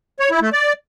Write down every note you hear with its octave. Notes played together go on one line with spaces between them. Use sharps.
C#5
E4
A3
D5